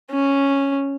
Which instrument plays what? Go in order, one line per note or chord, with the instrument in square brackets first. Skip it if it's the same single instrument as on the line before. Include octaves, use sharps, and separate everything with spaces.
[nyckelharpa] C#4